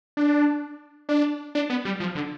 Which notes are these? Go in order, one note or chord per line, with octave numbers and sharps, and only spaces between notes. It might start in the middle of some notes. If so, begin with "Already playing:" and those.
D4
D4
D4
B3
G3
F3
D3